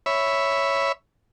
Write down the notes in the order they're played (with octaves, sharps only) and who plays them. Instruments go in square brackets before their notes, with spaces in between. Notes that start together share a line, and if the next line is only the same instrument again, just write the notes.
[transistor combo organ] C#5 E5 B5